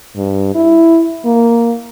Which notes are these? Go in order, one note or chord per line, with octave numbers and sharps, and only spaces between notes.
G2
E4
A#3